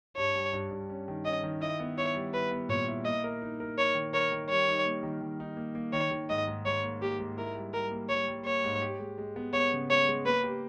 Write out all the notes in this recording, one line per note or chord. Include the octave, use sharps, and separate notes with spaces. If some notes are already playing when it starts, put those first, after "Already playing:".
G2 C#5
G3
G2
G2
C#4
D#3
C#4 D#5
D#3
E4 D#5
B3
E4 C#5
G3
E4 B4
B3
A#2 C#5
E4
A#3 D#5
A#4
D#4
A#4
A#4 C#5
D#3
A#4 C#5
D#3
G3 C#5
D#4
A#3
D#3
D#3
D#4
A#3
A#3
D#3 C#5
D#3
G#2 D#5
G#2
G#2 C#5
A#3
A#3 G4
G#2
E4 A#4
G3
G3 A#4
A#3
G3 C#5
G3
A#3 C#5
G#2
G4
G#3
G#3
B3
B3 C#5
C#3
G#3 C#5
G#3
A#3 B4
G4